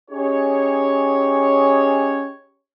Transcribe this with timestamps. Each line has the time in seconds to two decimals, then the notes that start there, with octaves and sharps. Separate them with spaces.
0.10 C#4 D#4 G4 G#4 C#5